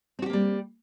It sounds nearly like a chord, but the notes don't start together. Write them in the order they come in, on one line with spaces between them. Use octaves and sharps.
C4 F#4 G4 A#3 G3